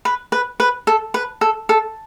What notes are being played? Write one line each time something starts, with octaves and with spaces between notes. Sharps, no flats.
B4
B4
B4
A4
B4
A4
A4